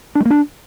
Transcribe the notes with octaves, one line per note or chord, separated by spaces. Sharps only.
D4
G#3
A#3
D4